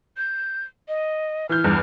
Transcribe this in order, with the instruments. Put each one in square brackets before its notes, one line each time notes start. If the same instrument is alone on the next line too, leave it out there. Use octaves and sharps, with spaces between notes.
[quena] G6
D#5
[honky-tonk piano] E3 G6 [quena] F6
[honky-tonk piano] E2 G2